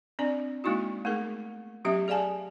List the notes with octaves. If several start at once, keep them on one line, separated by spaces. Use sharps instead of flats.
C4 D4 D5
G#3 A#3 D#4 E4 F#4
A3 B3 D#4 G#4 A#4
F#3 B3 C#4 G4 E5
G#4 D5 F5 G#5 A5